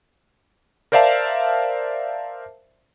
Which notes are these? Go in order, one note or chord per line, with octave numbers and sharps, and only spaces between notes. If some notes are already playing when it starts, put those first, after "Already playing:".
A#4 C5 D5 E5 F5 A5